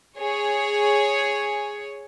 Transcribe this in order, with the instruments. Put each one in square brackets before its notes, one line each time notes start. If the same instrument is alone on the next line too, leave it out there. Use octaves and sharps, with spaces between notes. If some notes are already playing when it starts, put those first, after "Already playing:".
[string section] G#4 C#5